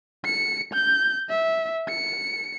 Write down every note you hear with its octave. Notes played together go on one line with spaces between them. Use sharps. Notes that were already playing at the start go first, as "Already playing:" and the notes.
C#7
G6
E5
C#7